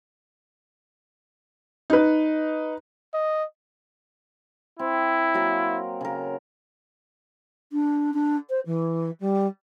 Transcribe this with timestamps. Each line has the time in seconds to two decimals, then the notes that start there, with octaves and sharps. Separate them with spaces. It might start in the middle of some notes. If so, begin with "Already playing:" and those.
1.90 D#4 B4
3.14 D#5
4.79 C4 E4
5.34 F#3 A#3 A#4
6.01 C#3 A#4
7.72 D4
8.14 D4
8.50 C5
8.66 E3
9.20 G3